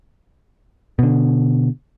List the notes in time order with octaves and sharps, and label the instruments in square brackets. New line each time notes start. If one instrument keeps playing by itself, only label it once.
[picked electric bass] B2 D3